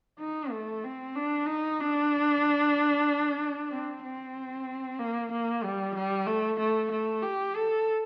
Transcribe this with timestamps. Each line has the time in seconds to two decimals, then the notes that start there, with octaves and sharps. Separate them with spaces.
0.19 D#4
0.51 A3
0.84 C4
1.16 D4
1.47 D#4
1.80 D4
3.71 C4
4.03 C4
4.99 A#3
5.32 A#3
5.63 G3
5.95 G3
6.26 A3
6.59 A3
6.91 A3
7.22 G4
7.55 A4